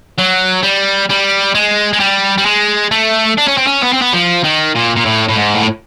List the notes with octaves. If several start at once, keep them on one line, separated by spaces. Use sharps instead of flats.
F#3
G3
G3
G#3
G#3
G3
G3
G#3
A3
D4
C#4
C4
C#4
B3
C4
B3
F3
D#3
A#2
A#2
A2
A2
G#2
A2